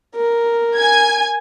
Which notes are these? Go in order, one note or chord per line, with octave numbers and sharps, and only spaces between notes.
A#4
G#5 G#6